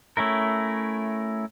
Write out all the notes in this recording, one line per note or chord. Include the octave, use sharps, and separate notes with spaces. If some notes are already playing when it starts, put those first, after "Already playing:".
A3 C#4 E4 A#4